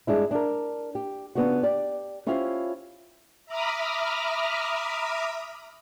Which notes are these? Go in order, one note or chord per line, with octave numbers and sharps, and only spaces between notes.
G2 G#3 D4 E4
D4 A#4
G4
C#3 B3 D4 F4 F#4
G4 D5
C#4 E4 F4 G4 C5 F5
E5 A#5 B5 D6 D#6 F6